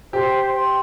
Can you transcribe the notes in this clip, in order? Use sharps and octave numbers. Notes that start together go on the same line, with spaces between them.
G4 C5
G5 C6